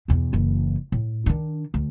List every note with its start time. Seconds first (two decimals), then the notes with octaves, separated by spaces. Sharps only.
0.08 E2 B2
0.33 F#1 E3
0.92 A2
1.26 D#3 D4
1.74 D2